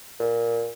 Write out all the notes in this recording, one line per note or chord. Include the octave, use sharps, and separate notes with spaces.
A#2